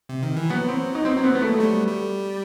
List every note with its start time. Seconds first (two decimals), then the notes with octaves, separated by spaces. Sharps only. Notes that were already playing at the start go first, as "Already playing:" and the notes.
0.09 C3
0.23 D#3
0.36 E3
0.50 F#3 B3
0.68 C4
0.95 D#4
1.05 C4
1.17 C4
1.23 B3
1.35 B3
1.42 A3
1.60 G3
1.88 G3